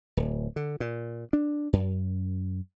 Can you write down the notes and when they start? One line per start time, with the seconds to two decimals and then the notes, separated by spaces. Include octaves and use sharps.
0.17 D1
0.56 D3
0.80 A#2
1.33 D4
1.73 F#2